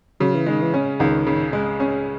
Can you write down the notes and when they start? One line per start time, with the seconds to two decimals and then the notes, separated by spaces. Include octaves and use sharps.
0.20 C#3 F#3
0.34 E3
0.46 D#3 G#3
0.62 E3
0.74 C#4
1.00 C#2 D#3
1.27 C#3
1.53 G#3
1.80 C#4